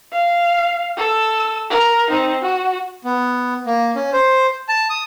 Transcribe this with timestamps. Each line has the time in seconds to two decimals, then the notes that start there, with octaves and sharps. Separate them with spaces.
0.12 F5
0.97 A4 E6
1.70 A#4
2.10 C4 D#4
2.42 F#4
3.04 B3
3.66 A#3
3.95 C#4
4.13 C5
4.69 A5
4.90 D#6